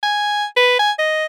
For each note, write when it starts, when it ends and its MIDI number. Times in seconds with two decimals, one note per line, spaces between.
0.03 0.45 80
0.56 0.75 71
0.79 0.92 80
0.99 1.26 75